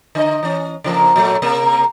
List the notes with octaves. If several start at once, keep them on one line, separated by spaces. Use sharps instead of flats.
D3 D#5
E3 C#4
C#3 F3 A#3
A#2 F#3 A3
C3 A#3